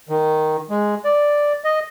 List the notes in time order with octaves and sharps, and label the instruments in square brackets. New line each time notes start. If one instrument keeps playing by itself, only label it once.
[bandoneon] D#3
G#3
D5
D#5